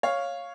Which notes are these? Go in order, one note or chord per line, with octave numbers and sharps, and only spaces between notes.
C#5 F5